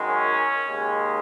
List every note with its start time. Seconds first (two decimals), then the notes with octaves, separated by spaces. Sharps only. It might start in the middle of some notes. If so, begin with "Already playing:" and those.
Already playing: F#2 D#3 G#3
0.08 C#4
0.67 D#2 C#3 G#3